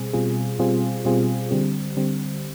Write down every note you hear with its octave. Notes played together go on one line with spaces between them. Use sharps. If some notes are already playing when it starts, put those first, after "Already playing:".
Already playing: B2 G3 C4 G#4
B2 G3 C4 F4 G#4
B2 G3 C4 F4 G#4
B2 G3 C4 F4 G#4
D3 G3 C4
D3 G3 C4